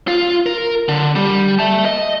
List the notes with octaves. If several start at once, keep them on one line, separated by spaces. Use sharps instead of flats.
F4
A#4
D3
G3
E5 A5
D#5